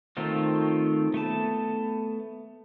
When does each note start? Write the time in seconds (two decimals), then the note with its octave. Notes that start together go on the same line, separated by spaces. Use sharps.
0.17 D#3 A3 C4 D#4 F4
1.14 A3 B3 A5